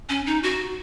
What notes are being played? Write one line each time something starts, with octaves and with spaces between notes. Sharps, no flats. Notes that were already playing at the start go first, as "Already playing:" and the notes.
C#4
D#4
F#4